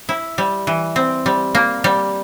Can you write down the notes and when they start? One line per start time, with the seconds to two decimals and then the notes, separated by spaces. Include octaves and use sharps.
0.09 E4
0.38 G3
0.67 E3
0.96 C4
1.26 G3
1.55 A#3
1.84 G3